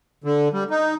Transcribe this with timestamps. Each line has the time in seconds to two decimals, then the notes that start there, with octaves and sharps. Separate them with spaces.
0.24 D3
0.53 G3
0.70 D#4